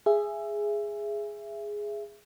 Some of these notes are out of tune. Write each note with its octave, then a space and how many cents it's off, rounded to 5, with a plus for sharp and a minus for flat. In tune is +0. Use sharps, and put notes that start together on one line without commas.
G#4 +0 E5 +20